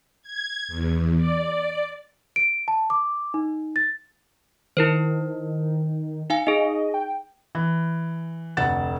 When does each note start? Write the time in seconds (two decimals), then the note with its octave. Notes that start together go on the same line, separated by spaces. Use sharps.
0.22 G#6
0.68 E2
1.17 D5
2.36 D7
2.68 A5
2.90 D6
3.34 D#4
3.76 A6
4.77 D#3 E4 A#4 C5
6.30 D#4 F5 G#5
6.47 D#4 G#4 D#5
6.94 G5
7.55 E3
8.57 F1 D2 F#5 A6 E7